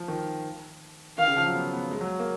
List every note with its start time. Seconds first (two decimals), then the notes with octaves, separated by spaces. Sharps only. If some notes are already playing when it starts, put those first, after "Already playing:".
Already playing: F3
0.08 D#3
1.18 D#3 F5
1.28 C#3
1.36 F3
1.46 F#3
1.55 B3
1.73 B3
1.91 G#3
2.01 F#3
2.19 A#3